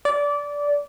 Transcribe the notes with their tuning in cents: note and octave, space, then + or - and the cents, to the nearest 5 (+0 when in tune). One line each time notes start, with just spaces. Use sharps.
D5 -20